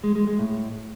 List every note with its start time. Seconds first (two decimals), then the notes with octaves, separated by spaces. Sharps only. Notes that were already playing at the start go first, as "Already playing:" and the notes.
0.04 G#3
0.15 G#3
0.27 G#3
0.39 A2